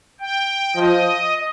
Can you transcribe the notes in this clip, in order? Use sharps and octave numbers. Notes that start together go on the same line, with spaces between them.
G5
F3 D#5